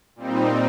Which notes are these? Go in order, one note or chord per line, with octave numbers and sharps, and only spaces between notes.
A#2 G3 C4 D#4